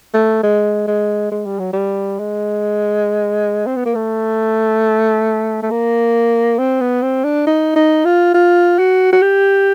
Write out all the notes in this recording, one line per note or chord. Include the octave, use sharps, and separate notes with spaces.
A3
G#3
G#3
G#3
G3
F#3
G3
G#3
C4
B3
A#3
A3
A3
A#3
C4
B3
C4
D4
D#4
D#4
F4
F4
F#4
F#4
G4